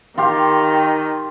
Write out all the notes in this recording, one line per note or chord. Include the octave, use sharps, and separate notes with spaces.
D#3 F4 G4